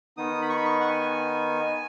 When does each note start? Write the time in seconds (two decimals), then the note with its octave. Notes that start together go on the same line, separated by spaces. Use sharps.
0.17 D#3 B3 D#4 D#6
0.42 B5
0.49 C#6
0.56 B5
0.65 C#6
0.80 F#5
0.90 G#5